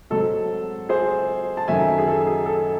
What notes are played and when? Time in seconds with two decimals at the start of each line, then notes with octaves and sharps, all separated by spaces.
0.10 G#2 F#3 C4 A4
0.89 G#4 C5
1.57 A5
1.68 F#2 D#3 F#3 A3 E5 G#5
1.98 G#4
2.08 A4
2.27 G#4
2.46 A4